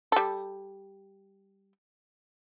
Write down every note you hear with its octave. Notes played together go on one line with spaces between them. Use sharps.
G3 A4